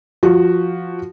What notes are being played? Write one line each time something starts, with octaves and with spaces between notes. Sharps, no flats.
F3 F#4